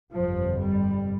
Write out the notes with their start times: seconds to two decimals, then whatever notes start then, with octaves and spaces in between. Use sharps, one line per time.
0.12 G1 F2 C3 F3
0.60 G3